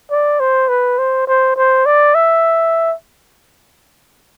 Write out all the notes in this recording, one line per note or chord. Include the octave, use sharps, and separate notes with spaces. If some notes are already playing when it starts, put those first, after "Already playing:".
D5
C5
B4
C5
C5
C5
D5
E5